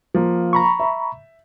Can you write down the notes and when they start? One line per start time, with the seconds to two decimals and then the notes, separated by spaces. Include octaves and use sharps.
0.14 F3 A#3
0.53 A#5 B5 C#6
0.80 E5